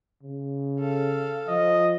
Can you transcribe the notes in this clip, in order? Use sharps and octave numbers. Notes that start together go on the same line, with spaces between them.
C#3
A4 F5
F3 D#5